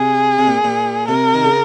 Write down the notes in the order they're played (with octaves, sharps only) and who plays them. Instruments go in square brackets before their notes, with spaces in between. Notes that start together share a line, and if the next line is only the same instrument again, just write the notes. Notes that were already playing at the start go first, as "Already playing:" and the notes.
Already playing: [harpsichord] C3 [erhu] G#4
[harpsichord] C3
A#2
A#2
[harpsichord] C3 [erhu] A#4
[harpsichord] D#3
C#3